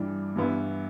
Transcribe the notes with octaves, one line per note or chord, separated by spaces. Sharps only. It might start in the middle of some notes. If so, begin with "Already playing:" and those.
Already playing: G2 E3 G3 D4
G2 E3 B3 E4